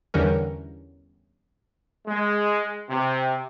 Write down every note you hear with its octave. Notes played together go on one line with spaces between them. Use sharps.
E2 D3 E3 G3 C#4 A#4
G#3
C3